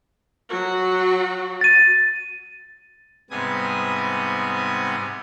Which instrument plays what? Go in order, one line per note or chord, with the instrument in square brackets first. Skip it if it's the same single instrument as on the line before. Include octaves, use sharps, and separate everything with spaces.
[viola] F#3 F#4
[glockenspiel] A6 D#7
[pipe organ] G#2 C3 G3 B3 G#5 D#6